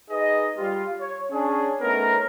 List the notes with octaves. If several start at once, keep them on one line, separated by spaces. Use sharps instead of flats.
D#4 G#4 B4 D#5
G3 F4
C#5
C#4 D4 G#4
A3 B3 C#4 D#4 A#4